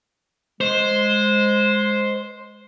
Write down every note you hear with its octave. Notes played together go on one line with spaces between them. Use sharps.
G#3 C5